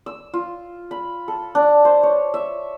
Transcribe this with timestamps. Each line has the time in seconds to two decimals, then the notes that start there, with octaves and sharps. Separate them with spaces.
0.06 E6
0.34 F4
0.91 B5
1.28 A4
1.55 D4
1.85 C5
2.03 C#5
2.34 E5